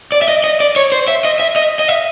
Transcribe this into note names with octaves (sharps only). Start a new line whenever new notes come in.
D5
E5
D#5
D#5
D5
C#5
C5
E5
D#5
E5
D#5
D#5
E5